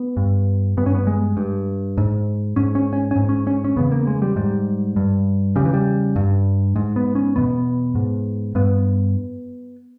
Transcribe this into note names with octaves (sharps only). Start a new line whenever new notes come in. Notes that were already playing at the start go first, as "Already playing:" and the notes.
Already playing: B3
G2
G2 B3
C#4
B3
G#3
G2
G#2
G#2 C#4
C#4
C#4
C#4
G#2
C#4
C#4
C#4
E2 C#3 B3
A#3
G#3
G3
G#2 G3
G2
E2 C#3 G3
E3
G3
G2
G#2
B3
C#4
E2 B2 B3
G#2
G2 B3